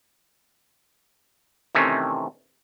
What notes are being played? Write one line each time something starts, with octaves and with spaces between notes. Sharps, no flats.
C3 D#3 E3 A3 C4 C#4